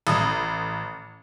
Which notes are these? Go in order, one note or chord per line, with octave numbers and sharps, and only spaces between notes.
A1 D#6